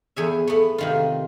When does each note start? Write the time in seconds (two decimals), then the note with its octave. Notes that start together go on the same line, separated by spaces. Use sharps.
0.16 E2 G#4 E5
0.47 A3 B3
0.78 C3 D#3 F4